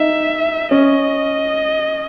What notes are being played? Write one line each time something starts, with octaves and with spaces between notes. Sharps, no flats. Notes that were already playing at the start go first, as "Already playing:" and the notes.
Already playing: D#4 E5
C#4 D#5